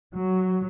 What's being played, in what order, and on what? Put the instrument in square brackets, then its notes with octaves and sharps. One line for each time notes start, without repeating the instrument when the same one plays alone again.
[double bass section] F#3